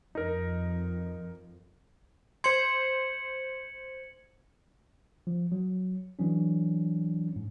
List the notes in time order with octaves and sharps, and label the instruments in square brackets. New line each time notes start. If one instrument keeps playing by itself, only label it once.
[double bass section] F2 [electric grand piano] D#4 A#4
[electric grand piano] C5 C6 [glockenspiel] G#6 C#7 F#7
[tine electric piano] F3
F#3
E3 F#3 C#4 D4
G#2